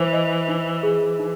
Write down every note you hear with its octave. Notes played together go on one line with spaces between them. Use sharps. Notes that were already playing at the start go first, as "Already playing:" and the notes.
Already playing: E3 C5
D#5
D#4
G#4
D#4